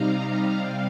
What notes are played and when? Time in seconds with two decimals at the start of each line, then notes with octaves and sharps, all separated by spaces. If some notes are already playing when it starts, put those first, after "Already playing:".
Already playing: C3 G3 D#4 F5 A#5
0.57 C3 G3